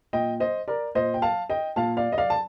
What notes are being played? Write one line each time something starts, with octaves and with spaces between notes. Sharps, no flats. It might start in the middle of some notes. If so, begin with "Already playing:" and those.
A#2 D#5 G5
C5 D#5
A#4 D5
A#2 C5 D#5
G5
F5 A5
D#5 G5
A#2 F5 A5
D5 F5
D#5
D5 F5
A5